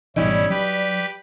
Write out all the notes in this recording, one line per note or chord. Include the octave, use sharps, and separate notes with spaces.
G#1 B2 E3 G3 C#4 D#4 E4 D5
F#3 G4 B4